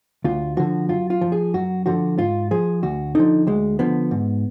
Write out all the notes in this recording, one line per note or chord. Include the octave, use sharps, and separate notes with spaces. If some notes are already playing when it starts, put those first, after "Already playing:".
D2 F4
D3 F3 F#4
F#2 F4
F4
F3
G#4
F#2 F#4
D3 F3 F#4
G#2 F4
F3 G#4
D2 F#4
D3 F3 D#4
D2 G#3
D3 F3 B3
G#2